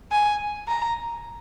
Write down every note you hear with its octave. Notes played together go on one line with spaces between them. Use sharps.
G#5
A#5